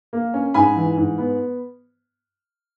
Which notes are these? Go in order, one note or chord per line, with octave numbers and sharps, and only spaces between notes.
A#3
C#4
G#2 G#5 B5
E3
G#2
B3